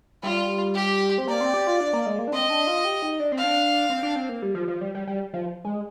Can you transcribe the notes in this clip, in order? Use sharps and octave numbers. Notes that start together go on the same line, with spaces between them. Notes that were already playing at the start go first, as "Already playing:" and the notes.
G3 F4
G4
C4
A#3 D5
C4
G4
F4
D4
A#3
G#3
A#3
D4
C4 D#5
D4
F4
G4
D#4
D4
C4
F5
D4
C4
D4
C4
A#3
G3
F3
F3
G3
G3
G3
F3
G#3